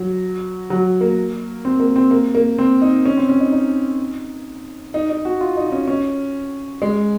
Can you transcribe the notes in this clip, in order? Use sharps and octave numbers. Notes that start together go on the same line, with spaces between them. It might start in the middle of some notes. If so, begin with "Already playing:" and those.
Already playing: F#3
F#3
A#3
C4
A#3
C4
A#3
A#3
C4
D#4
C#4
C4
C#4
D#4
D#4
D#4
D#4
F#4
F4
D#4
D#4
C#4
C#4
G#3